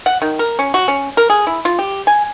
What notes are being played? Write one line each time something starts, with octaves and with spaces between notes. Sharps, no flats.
F#5
D#3
A#4
C#4
F#4
C#4
A#4
G#4
E4
F4
G4
G#5